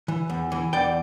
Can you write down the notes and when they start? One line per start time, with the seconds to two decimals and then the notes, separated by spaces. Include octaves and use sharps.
0.08 E3
0.30 E2
0.52 E3
0.73 E2 D5 G5